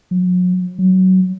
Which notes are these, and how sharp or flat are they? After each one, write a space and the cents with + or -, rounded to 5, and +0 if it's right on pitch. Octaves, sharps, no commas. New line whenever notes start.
F#3 -40
F#3 +15